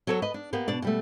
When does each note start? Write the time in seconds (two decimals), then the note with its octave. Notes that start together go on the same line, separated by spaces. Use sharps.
0.07 F#3 F#4 A4 C5 C#5
0.22 B4 D#5
0.34 D4
0.53 A#3 B3 G4
0.68 B2 D4 D5
0.82 B2 G3 A3